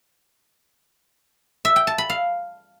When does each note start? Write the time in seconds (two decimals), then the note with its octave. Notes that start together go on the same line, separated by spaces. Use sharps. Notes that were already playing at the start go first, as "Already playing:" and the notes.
1.65 E5
1.76 G5
1.87 A5
1.98 B5
2.10 F5